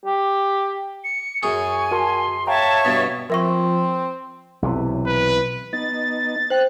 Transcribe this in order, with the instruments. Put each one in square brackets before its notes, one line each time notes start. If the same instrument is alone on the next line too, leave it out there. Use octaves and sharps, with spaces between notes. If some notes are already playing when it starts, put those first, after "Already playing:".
[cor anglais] G4
[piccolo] C#7
[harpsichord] F#2 G#4 [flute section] G#5 [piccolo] C#6
[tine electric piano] F#4 A#4 A5 [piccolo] C6
[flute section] C#5 E5 C#6 [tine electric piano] F5 G5 A#5 [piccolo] A5
[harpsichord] G2 B2 [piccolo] A6
[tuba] F3 [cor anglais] C4 [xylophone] A#4 E5 C#6
[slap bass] B1 C3 E3
[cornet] B4
[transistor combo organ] B3 D#4 [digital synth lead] A6
[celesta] C5 G5 [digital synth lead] F#6